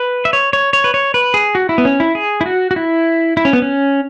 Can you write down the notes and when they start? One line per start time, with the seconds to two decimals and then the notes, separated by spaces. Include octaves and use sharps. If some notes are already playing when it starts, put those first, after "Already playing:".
Already playing: B4
0.25 E5
0.33 C#5
0.53 C#5
0.73 C#5
0.84 B4
0.94 C#5
1.14 B4
1.34 G#4
1.55 F#4
1.69 E4
1.78 B3
1.85 C#4
2.00 E4
2.15 G#4
2.41 E4
2.46 F#4
2.71 F#4
2.76 E4
3.37 E4
3.45 C#4
3.53 B3
3.62 C#4